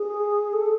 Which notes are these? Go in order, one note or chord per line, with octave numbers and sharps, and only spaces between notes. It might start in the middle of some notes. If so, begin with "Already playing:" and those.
Already playing: G#4
A4